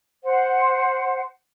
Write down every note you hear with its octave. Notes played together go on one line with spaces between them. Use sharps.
C5 F#5